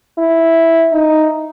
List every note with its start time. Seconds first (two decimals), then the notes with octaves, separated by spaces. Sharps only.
0.18 E4
0.93 D#4